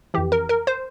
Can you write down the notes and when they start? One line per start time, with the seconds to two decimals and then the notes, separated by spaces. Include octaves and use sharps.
0.14 F2 E3 G4
0.32 A#4
0.49 A#4
0.67 C5